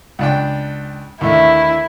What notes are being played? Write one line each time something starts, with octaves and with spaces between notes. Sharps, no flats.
C#2 D4 G5
D#2 A2 D3 E4